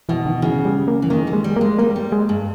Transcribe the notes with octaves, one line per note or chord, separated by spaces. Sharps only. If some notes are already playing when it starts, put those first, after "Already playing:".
B2 E3
D#3
C#3 E3
G3
A#3
E3
D#3 A#3
G3
G#3
G3
A#3
G#3
G3 A#3
G3
G#3
G2